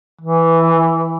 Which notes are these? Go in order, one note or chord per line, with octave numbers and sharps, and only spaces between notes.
E3